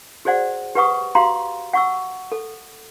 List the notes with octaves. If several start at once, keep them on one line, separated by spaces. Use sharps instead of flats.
F#4 G#4 C5 D5 F#5
G4 B4 F#5 C#6 D#6
F#4 G4 F5 A#5 C6
F#5 C#6 E6
A4